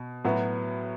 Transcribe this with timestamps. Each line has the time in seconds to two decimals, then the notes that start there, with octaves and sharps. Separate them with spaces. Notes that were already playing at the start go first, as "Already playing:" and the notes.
Already playing: B2
0.24 A2 F#3 B3 F#4